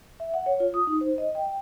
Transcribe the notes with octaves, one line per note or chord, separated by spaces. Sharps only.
E5
F#5
C#5
F4
D#6
D#4
C5
D#5
G5